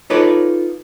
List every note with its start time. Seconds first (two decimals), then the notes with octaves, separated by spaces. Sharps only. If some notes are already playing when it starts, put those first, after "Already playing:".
0.10 D#4 F4 A4 B4 C#5 D5